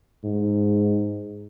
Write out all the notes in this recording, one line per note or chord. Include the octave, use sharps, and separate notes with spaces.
G#2